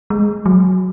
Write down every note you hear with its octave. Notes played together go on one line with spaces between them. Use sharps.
G#3
F#3